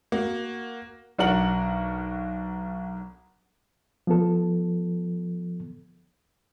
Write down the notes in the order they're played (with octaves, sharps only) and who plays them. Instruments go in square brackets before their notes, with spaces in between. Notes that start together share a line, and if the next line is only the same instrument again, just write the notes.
[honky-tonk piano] A#3 F#4
[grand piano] B1 D4 F#4 A#4 F#5 F#7
[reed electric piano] F3 B3 A4